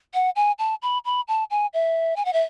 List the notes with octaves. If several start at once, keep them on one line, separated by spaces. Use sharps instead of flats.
F#5
G#5
A5
B5
B5
A5
G#5
E5
G#5
F#5
E5